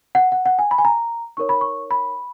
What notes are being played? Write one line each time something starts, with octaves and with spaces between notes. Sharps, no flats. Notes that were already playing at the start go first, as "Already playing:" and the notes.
F#5
F#5
F#5
G#5
B5
G#5
A#5
D#4 A#4 C#5 C#6
B5
C#6
B5